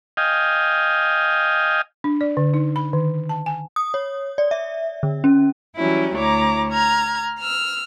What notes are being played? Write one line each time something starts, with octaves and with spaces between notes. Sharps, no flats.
D#5 F5 G5 G#5
D4
D5
D3
D#4
B5
D#3
A5
G#5
D#6
C#5
D5
E5
D3
C#4
E3 F#3 G3 C#4 E4
D2 E4 C#5 A#5 D6
A#5 F6 G#6
E6 F6